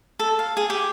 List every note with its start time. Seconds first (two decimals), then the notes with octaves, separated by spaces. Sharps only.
0.19 A4
0.39 F5
0.57 G#4
0.70 G4